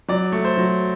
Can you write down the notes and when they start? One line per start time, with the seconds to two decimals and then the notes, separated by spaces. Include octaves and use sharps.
0.09 F#3 D5
0.32 A3
0.45 C5
0.57 F#3